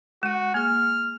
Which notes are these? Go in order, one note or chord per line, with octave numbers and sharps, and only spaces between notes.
G#3 F#4 F#5
A#3 G#4 F6